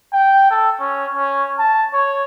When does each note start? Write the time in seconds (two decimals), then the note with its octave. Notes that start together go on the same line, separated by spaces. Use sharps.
0.13 G5
0.51 A4
0.80 C#4
1.15 C#4
1.59 A5
1.94 C#5